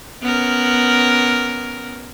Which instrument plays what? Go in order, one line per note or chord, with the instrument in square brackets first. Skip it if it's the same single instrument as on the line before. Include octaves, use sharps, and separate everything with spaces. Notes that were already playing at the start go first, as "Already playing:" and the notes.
[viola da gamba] B3 C#4 A#4